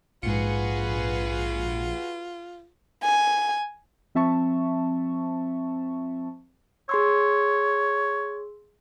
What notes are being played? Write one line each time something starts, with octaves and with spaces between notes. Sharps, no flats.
A#1 G#2 F4 F#4 G#4 B4 C#7
G#5
F3 C4 E5 A5 C#6
G#4 C#5 C6 E6